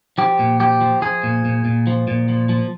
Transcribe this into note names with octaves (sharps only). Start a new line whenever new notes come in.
F3 G4
A#2
F3 G4
F3
F3 G#4
A#2
A#2
A#2
F3
A#2
F3
F3